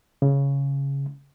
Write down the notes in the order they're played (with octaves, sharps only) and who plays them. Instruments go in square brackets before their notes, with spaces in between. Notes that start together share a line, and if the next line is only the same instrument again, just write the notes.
[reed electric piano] C#3